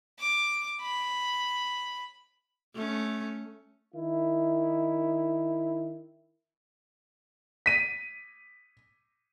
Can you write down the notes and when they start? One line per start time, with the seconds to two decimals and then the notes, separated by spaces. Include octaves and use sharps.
0.19 D6
0.81 B5
2.75 A3 C#4
3.94 D#3 E4
7.66 B6 D#7